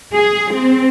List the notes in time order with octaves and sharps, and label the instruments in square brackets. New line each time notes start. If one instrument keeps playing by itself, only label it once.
[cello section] G#4
C4